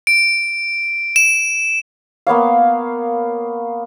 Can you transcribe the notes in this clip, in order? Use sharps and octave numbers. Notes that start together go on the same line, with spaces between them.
D7
E7
A#3 B3 C#5 F5